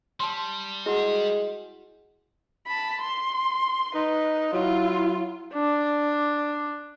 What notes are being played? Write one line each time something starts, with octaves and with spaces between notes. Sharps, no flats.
G3 A5 C6
G#3 E4 F#4 F#5
A5 B5
C6
D#4 B4
F#3 E4 F4
D4